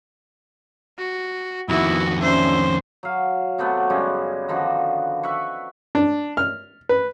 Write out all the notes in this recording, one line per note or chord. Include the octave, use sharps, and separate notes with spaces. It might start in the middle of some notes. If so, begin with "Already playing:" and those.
F#4
F2 D#3 B3 E4 F#4
F#3 C#4 D4 C5 E5
F#3 F5
C3 F#3 A3 B3
F#2 C#3 G3 G#3
D3 D#3 F3 F#4
B4 E5 F#5 C#6
D4
F6
B4